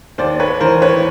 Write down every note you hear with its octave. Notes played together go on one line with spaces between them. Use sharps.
D#2 C5 D5
B4 C#5
E3 A#4 C5
B4 C#5